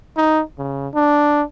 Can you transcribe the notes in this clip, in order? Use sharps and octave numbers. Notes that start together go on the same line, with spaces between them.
D#4
C#3
D4